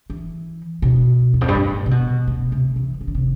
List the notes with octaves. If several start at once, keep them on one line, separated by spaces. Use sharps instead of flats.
E3
B2
E2
F2
G2
A2
C3
B2
B2
C3
E3
C3
D3
C3